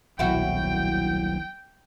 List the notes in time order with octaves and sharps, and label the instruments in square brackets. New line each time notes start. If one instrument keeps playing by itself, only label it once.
[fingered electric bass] D#1 B1 F#3 [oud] E4 F#4 [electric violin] G5